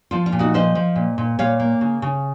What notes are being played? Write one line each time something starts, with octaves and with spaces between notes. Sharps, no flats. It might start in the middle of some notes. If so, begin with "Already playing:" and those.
F3 F4
F4
A#2
D#4 F#4
F3 C5 D#5
F3
A#2
A#2
A#2 C#5 F5
A#3
C#3
C#3